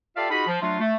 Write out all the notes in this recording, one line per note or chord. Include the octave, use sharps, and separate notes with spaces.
F4 G4 A4 D5 E5 F5
D#4 F4 F#4 G#4 B5
F3
F#3 A3 D4 F4
A3